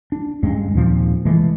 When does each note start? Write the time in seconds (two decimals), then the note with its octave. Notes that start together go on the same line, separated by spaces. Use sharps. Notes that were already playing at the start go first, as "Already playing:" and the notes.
0.12 D4
0.43 D2 G2 G#3 C#4
0.74 D#2 A#2 F3 C4
1.25 C3 E3 G#3 A3